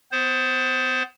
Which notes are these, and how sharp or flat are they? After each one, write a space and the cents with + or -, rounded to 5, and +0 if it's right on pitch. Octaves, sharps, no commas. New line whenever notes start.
B3 +30 C5 +5